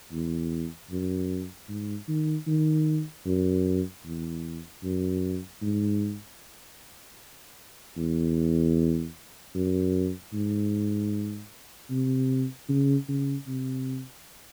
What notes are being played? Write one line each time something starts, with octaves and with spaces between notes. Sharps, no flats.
E2
F#2
G#2
D#3
D#3
F#2
E2
F#2
G#2
E2
F#2
G#2
C3
C#3
C#3
C3